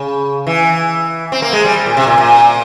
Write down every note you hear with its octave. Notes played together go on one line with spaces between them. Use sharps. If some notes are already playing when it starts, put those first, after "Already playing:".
Already playing: C#3
E3
C4
A#3
G#3
G3
A#2
C3
A#2
A#2